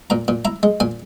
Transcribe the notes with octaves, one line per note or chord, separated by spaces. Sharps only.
A#2 A#5
A#2
E4 A#5
G#3
A#2 G#5